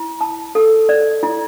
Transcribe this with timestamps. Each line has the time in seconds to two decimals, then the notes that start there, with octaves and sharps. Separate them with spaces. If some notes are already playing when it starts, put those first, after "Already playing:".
Already playing: E4
0.21 A5
0.55 A4
0.89 D5
1.23 E4